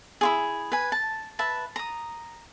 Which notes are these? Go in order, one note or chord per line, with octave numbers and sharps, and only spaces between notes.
E4 F4 G#4
B4 G#5
A5
B4 E5 A5
A#5 D#6